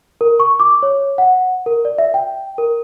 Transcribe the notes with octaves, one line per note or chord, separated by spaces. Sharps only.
A#4
C#6
D6
C#5
F#5
A#4
D5
E5
G5
A#4